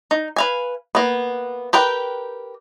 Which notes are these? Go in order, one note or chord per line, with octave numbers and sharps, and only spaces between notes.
D#4
B4 F5 G#5
A#3 B3
G4 A#4 B4 G5